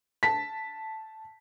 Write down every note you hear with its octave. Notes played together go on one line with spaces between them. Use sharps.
A5 B6